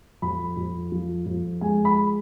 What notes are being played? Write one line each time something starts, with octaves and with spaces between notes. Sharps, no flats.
F2 B5
F2
F3
F2
G#3 G#5
B5